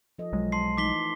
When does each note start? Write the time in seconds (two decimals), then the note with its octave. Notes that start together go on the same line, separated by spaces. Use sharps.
0.19 F3 A4 D#5
0.33 B1 F#3 G#3
0.52 A5 C6 C7
0.77 E3 A3 D#4 D6 B6 G7